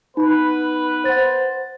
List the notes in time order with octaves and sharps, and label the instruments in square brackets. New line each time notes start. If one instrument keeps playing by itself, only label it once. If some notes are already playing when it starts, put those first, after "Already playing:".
[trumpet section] B3 B4 [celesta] D#4 B5
[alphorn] C5 [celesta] F#5 A6